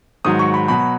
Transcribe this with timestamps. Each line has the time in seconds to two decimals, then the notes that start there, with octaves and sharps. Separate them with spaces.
0.25 G#2 D#3 F#3 D#6
0.39 C#6
0.54 B5
0.68 B2 F#3 B5